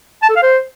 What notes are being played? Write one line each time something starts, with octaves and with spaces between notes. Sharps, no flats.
A5
A4
F5
C5